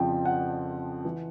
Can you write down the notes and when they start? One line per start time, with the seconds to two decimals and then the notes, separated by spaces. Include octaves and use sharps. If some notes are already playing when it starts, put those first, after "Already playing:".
Already playing: F2 C#3 F3 G5
0.25 F#5
1.05 E3